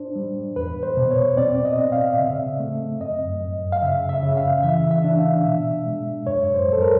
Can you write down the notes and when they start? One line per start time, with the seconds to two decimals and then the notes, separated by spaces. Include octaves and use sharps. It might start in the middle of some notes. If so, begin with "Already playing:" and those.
Already playing: D4 C5
0.16 G3
0.56 E2 B4
0.83 C5
0.97 B2
1.11 C#5
1.37 C4 D5
1.65 D#5
1.79 C4
1.92 F5
2.19 C#3 E5
2.60 A3
3.01 F#2 D#5
3.41 F#2
3.72 F5
3.82 C#3 E5
4.09 E5
4.23 C#3
4.37 F5
4.63 E3 E5
4.91 E5
5.04 D4
5.18 F5
5.45 B2 E5
5.86 G#3
6.27 F#2 C#5
6.54 C5
6.68 F#2 A4
6.82 A#4